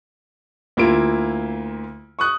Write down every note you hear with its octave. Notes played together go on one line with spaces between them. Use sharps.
D2 A#3 E4 F4 E5 D7
C#6 D#6 F#6